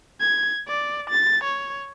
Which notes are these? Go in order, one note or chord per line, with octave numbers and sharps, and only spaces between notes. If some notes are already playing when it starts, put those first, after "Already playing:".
G#6
D5
A6
C#5